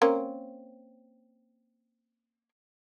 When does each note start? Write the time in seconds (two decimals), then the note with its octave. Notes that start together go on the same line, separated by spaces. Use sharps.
0.02 A#3 C4 C#4